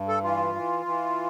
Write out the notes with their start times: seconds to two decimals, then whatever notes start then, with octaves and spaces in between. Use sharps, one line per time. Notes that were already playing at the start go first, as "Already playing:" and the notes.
Already playing: G2
0.08 A4
0.23 E3 F4
0.55 E3
0.86 E3